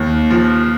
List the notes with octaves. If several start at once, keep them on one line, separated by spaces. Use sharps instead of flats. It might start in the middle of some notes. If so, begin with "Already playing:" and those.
Already playing: D#2
F3